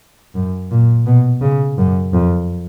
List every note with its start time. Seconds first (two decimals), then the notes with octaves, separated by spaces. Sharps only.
0.35 F#2
0.71 A#2
1.06 B2
1.41 C#3
1.78 F#2
2.13 F2